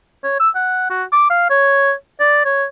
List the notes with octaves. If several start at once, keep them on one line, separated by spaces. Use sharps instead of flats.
C#5
E6
F#5
F#4
D6
F5
C#5
D5
C#5